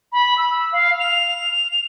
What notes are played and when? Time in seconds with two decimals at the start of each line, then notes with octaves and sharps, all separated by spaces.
0.12 B5
0.38 E6
0.72 F5
1.00 F7